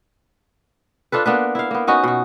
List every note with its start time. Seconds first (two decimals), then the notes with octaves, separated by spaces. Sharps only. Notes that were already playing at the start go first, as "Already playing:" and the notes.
1.12 D4 F4 A4 B4
1.26 A#3 B3 D4 B4
1.55 E4 F5
1.71 A#3 B3
1.87 B3 C#4 D#4 F#4
2.04 B2 F#4